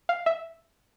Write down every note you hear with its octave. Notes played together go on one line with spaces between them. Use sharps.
F5
E5